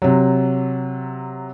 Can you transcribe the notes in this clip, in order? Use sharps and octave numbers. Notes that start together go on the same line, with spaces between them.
C3 F#3